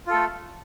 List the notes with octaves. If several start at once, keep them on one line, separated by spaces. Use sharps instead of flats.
A3 F4 A4